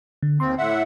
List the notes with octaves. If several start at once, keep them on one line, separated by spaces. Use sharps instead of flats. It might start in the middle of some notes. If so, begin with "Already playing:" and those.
D3
D#2 C4 C6
A2 E5 F#5